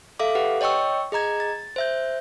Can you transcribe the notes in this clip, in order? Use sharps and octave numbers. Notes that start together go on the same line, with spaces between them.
A4 E5 F5 D6
G4 B4 F#5
C#5 D#5 G5 C#6 E6
G#4 D#5 A#5 G#6
A6
C5 E5 G6